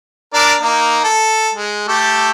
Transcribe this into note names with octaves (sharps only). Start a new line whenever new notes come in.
D4 A#4 D5
A#3 D#4
A4
G#3
A3 G4 A4